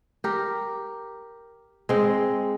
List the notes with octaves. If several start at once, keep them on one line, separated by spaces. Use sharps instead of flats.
G4 A#4
G#3 C4